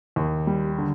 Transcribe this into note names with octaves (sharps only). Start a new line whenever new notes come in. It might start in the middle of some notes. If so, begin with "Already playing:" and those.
D#2
G3
D3